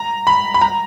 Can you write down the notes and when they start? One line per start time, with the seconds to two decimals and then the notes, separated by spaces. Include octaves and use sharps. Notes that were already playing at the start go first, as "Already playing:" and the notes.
Already playing: A#5
0.27 B5
0.54 B5
0.61 A#5